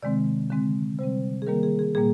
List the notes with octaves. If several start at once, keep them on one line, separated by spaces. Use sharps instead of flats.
C3 D#3 G#3 C4 D5
D3 G#3 C4
C3 G3 C4 C5
G#4
D#3 G3 A#3 A#4
G#4
G#4
A#2 G3 A#3 G#4